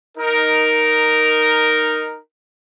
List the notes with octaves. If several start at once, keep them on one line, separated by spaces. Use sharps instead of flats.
D#4 A#4